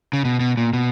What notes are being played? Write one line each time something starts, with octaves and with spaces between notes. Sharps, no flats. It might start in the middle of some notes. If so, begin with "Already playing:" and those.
C#3
B2
B2
A#2
B2